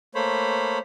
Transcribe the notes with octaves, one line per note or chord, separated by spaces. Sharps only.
A3 A#3 C5 C#5 B5